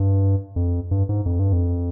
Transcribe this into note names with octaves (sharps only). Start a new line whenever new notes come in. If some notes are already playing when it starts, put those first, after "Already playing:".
Already playing: G2
F2
G2
G#2
F2
G2
F2